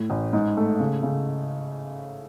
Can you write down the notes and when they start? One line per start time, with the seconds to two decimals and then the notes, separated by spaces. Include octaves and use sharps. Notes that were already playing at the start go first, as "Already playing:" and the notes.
Already playing: A2
0.10 A1
0.33 G#2
0.57 A3
0.80 C#3
1.03 C#3